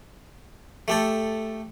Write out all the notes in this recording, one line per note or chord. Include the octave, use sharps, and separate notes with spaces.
A3 G4 A4